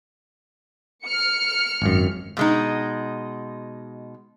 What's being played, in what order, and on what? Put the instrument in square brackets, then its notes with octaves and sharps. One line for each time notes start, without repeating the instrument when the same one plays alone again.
[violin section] F6 C#7
[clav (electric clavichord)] G#1 F#2
[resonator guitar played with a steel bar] B2 G#3 D#4